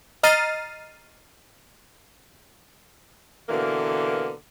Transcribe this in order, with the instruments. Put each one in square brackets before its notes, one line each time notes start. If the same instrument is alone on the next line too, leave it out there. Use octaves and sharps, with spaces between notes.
[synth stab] D#5 A#5 F6 A6 C7 D#7
[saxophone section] B2 D3 E3 A#3